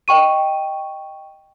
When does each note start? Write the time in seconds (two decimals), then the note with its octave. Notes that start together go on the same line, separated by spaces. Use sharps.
0.08 D#5 G5 C#6 D#7